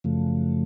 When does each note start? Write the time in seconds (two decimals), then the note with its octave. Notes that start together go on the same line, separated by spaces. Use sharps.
0.04 F#2 C#3 F3 A3